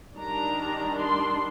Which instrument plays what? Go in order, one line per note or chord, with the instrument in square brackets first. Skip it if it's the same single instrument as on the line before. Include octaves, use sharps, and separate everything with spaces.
[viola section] D#3 G3 D4 A#5
C6